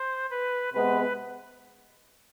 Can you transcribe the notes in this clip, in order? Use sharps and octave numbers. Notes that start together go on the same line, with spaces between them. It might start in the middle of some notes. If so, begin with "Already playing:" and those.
Already playing: C5
B4
C3 G#3 B3 B4